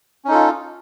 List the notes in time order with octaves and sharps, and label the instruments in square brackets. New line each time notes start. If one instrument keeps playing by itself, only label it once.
[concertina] C#4
D#4
A4
F4